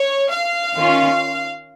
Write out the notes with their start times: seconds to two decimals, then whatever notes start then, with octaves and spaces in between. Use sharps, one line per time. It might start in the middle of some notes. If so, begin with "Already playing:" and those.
Already playing: C#5
0.31 F5
0.74 D#3 C#4 F4